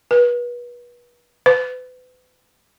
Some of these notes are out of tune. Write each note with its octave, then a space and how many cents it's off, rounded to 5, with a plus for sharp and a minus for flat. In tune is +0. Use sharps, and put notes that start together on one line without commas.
B4 -35
B4 +35